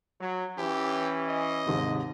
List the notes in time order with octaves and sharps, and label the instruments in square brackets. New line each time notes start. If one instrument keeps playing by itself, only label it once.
[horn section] F#3
[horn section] E3 C#4 [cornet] G4
[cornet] D#5
[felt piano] D#2 G#2 C3